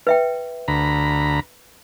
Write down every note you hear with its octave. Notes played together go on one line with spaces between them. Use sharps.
B4 E5 G5
D2 A#5 B5